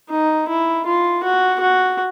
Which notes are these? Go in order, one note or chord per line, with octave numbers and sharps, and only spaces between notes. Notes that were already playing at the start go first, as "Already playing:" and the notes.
D#4
E4
F4
F#4
F#4